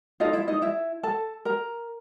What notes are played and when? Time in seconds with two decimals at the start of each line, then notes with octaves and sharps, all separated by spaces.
0.20 D#4 F4 A4 D#5
0.33 E4 E5
0.48 D#4 D#5
0.62 E4 E5
1.03 A4 A5
1.45 A#4 A#5